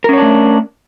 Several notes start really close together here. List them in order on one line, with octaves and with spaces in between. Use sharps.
A#4 C#4 C#5 D4 A3